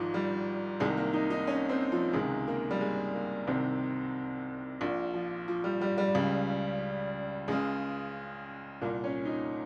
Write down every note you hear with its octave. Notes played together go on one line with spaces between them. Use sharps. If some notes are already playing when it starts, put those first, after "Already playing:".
Already playing: G#1 G#2 D#3 F3
G3
C2 C3 D#3 G#3
A#3
D#4
D#4
C#4
C4
F3
C#2 C3 D#3 G#3
A#3
G3
G#3
A#3
C2 C3 D#3 C4
A#1 A#2
F3
F3
G3
G3
G3
C#2 C#3
C#2 C#3 G#3
C2 A#2 A#3
C#4
D#4